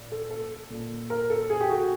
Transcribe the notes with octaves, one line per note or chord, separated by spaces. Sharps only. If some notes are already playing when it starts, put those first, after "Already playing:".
Already playing: A#2
A4
A4
A#2
A#4
A4
G#4
G4
F#4